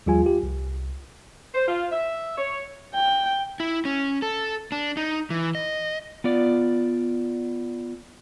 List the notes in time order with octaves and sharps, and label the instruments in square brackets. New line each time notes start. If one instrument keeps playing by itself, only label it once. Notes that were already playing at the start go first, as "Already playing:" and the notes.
[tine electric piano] D#2 F3 G3 F4 G#4 G#5
F4 G4
C2
[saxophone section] C5
F4
E5
C#5
[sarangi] G5
[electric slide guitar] E4
C#4
A4
D4
D#4
E3
D#5
B3 F4 D5